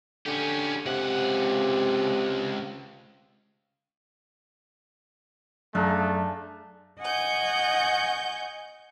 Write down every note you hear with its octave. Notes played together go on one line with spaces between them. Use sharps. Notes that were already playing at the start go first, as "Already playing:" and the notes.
D3 C#4 G4
C#2 C3 F#5
F#2 A3 D4 G#4 F5 A#5 A#6
D#5 F#5 G#5 C#6 G6